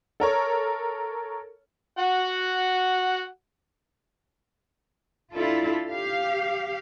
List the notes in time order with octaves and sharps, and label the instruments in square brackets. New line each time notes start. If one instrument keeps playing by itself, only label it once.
[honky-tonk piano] A4 A#4 C#5
[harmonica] F#4 F#5
[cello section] D4 E4 F4 A4
G4 F5